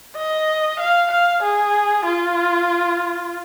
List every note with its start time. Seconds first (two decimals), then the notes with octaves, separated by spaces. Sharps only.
0.17 D#5
0.80 F5
1.11 F5
1.43 G#4
2.06 F4